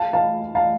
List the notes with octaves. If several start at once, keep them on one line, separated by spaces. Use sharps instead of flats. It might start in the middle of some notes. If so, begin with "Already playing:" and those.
Already playing: F5 A5
F5 A5
F5 A5